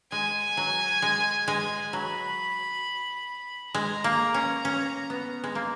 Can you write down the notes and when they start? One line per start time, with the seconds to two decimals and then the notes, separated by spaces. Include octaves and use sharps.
0.12 G#3 G#5
0.57 F#3
1.02 G#3
1.48 G#3
1.93 F#3 B5
3.74 G#3 A#5
4.04 A#3
4.34 C#4
4.65 C#4
5.10 B3
5.44 G#3
5.55 A#3